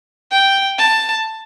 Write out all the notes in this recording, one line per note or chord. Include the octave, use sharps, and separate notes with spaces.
G5
A5